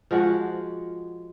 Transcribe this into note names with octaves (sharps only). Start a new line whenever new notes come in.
F3 G#3 F#4 F#5